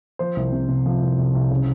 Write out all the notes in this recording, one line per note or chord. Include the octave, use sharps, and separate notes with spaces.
F3 C5
C2
C3
C3
F3
C2
C2
C2
C#3